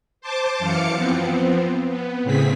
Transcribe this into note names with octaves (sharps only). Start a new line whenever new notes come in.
C5 A5 D6
F#2 E3 F5 D6 C#7
F3 B3 C4
B3
A2 C#3 C4 G#4 B6